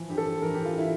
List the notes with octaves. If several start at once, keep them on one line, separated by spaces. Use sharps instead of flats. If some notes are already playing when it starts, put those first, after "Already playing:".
Already playing: E3 F3
G2 G4
A4
G2
E3 A#4
E3 G4
F4
E4